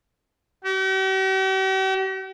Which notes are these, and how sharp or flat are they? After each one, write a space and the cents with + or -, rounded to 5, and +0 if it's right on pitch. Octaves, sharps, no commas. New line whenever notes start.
G4 -45